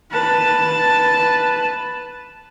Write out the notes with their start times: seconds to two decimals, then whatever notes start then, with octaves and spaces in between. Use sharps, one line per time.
0.12 B4 A5